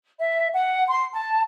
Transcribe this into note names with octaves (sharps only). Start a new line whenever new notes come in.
E5
F#5
C6
A5